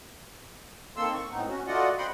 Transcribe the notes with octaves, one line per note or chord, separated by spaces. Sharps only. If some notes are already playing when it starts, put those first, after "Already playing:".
D#3 A#3 C4 A4 C6 E6
C#6
A2 B3 C4 D#4
C#4 F#4
A3 F4 F#4 D5 D#5 F#5
C4 D#5 F#5 G5 B5 C6